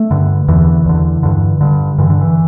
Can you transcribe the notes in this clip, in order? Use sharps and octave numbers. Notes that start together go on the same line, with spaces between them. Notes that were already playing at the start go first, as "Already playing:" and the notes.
Already playing: A3
G2 D3
E2 D3 E3
E2 D3
G2 D3
G2 D3
G2 D3 E3
D3
E3